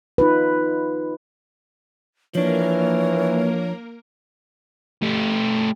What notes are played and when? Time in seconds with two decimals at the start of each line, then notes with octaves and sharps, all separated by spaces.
0.18 D#4 F4 B4
2.35 E3 F3 A#3 D4 A#4 C#5
5.02 A3 G4